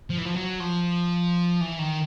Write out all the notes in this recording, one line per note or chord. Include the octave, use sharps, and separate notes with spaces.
F3
E3
F3
F#3
F3
E3
D#3